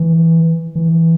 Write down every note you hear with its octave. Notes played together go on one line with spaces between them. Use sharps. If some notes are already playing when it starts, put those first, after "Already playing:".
Already playing: E3
E3